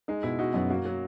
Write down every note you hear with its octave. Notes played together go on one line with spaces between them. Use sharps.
G#3 D#4
B2 E4
D#4 F#4
F#2 B3
A#3 F#4
F#3